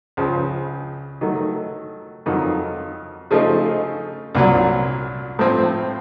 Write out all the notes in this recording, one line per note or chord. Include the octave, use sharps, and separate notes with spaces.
C#2 C#3 F3
D#3 F#3 A3
F2 D#3 F#3
C#3 F3 A3 D#4
C2 A#2 F#3
A2 F3 C4